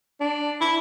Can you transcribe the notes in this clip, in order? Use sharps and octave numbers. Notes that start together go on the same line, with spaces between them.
D4
E4